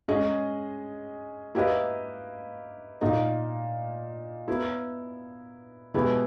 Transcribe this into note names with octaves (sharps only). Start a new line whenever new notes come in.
G#3 C#4 G#4 D#5
A#3 E4 G4 B4 D#5
A#2 A#3 D#4 A#4 D#5
B3 E4 A#4
B2 G#3 B3 E4 G4